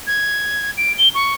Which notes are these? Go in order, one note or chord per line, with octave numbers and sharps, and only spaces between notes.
G#6
D7
G7
C#6